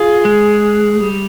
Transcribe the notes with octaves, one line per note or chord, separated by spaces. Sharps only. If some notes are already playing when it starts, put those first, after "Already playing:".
Already playing: F4 G#4
G#3
G3